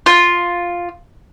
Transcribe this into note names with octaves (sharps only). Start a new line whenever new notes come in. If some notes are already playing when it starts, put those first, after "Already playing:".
F4